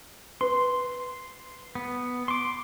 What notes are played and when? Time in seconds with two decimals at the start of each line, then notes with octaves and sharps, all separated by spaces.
0.41 B4 C6
1.75 B3
2.28 C6 D6